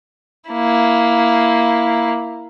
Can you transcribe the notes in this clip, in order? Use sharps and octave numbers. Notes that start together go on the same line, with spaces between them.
A#3 E4